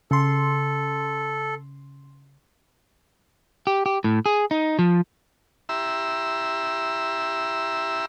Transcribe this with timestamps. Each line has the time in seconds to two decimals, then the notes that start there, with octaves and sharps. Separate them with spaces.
0.11 C#3 A4 C6
3.67 G4
3.86 G4
4.04 A2
4.26 G#4
4.51 D#4
4.79 F3
5.69 E4 G4 E5 A#5 C6 E6